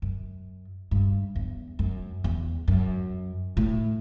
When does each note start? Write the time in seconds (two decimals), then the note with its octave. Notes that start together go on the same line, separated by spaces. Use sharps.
0.02 F#2
0.91 G2
1.36 E2
1.79 F#2
2.24 E2
2.68 F#2
3.57 A2